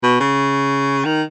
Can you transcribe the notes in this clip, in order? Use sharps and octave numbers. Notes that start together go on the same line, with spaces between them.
B2
C#3
D#3